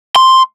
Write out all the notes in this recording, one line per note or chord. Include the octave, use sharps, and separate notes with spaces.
C6